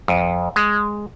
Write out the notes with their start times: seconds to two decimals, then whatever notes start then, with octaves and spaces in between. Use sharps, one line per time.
0.08 F2
0.56 G#3